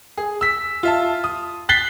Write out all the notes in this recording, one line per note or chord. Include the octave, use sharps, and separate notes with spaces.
G#4
E6 B6
F4 E5 A5
D#6
F#6 A6 B6 C7 G7